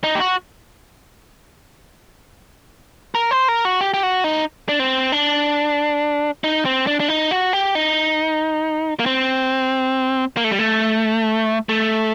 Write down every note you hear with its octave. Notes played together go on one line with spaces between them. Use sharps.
D#4
G4
F#4
A#4
C5
A#4
F#4
G4
G4
F#4
D#4
D4
C4
D4
D#4
C4
D4
D4
D#4
F#4
G4
D#4
A#3
C4
A#3
A3
G3
A3
A3